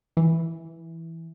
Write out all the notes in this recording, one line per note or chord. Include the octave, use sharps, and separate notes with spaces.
E3